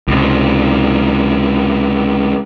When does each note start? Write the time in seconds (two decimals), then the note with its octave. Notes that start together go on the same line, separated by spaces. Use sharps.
0.08 C#2 C3